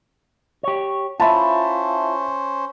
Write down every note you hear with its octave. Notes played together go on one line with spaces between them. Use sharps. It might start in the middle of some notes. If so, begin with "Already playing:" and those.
G4 C#5
C#4 E4 F4 C5 E5 A5